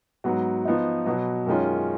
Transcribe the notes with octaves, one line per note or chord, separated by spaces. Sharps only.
G#2 F#3 B3 F#4
F3 B3 D#4
B2 F#3 B3 F#4
F#2 D#3 G#3 C#4 F4